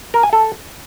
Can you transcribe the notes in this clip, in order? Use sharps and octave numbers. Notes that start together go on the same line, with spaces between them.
A#4
G#5
A4